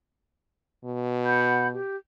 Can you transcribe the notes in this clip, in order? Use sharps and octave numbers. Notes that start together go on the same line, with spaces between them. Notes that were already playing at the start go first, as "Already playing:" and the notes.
B2
F#5 B5 G6
G4